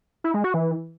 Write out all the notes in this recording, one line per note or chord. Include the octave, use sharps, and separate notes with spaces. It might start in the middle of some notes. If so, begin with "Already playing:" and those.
E4
G#3
F#4
E3